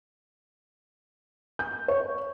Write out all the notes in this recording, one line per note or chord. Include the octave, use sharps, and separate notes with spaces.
G6
C#5